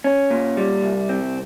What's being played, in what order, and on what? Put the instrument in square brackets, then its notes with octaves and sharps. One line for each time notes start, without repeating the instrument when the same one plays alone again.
[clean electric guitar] C#4
A#2
G3
C2
C4